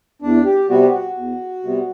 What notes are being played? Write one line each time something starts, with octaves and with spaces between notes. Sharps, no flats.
E2 D4
G4
C3 G3 B3 F#4
G4
F#4
E2
C3 G3 B3